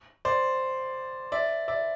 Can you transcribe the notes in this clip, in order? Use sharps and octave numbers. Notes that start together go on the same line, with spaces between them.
C5 D5
D5 E5
D5 E5